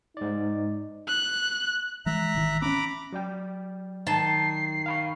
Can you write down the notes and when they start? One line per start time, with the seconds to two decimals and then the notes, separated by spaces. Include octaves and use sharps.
0.17 G#2 D#4 D5
1.08 F#6
2.06 E3 G#3 E5 A#5 F#6
2.35 A1 D#3 E3
2.62 C4 C#4 A#5 B5 D6
3.12 F#3 D5 G5
4.07 D#3 A5 C7
4.86 F5 B5 C#6